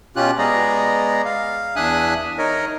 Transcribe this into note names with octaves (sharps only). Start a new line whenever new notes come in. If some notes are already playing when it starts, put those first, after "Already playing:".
B2 C#4 F4 G4 F#6
G#3 B3 G#4 D5 D#5 A#5
F5
E2 D4 E5 G#5 D#6 F#6
D#4 A#4 C#5 D#5